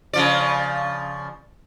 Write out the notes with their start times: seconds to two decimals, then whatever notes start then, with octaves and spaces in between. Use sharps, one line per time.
0.13 C#3 F3 D5